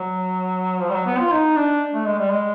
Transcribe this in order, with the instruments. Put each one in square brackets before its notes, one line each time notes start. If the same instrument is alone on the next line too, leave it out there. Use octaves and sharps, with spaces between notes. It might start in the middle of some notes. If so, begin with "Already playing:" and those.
Already playing: [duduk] F#3
F3
G3
F#3
B3
F4
D#4
D4
A3
G#3
G3
G#3